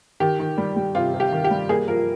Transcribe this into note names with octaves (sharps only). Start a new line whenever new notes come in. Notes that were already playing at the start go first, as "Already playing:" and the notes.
D#3 G4
D#3
G3
G3
C3 F4
C3
G4
D#3
G4
G3
A#3 G#4
F3 A#4